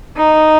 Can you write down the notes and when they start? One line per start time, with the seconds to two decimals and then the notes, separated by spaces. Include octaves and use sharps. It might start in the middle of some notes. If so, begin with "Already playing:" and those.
0.16 D#4